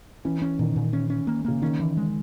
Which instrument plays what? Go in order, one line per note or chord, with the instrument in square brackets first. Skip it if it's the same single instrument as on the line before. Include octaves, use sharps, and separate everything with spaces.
[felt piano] E3 [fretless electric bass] C#4
[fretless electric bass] C#4
[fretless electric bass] A#2 [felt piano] D#3
[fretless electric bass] A#2
C#4
C#4
A#3
[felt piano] C#3 [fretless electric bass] A#3
[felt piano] D#3 [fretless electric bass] C#4
[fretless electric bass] E3
G#3